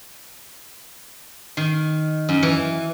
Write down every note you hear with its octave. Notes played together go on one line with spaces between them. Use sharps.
D#3
F#2
E3